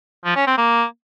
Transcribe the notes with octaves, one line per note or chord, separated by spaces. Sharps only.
F3
C#4
C4
A#3